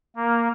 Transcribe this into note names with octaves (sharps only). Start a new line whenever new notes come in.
A#3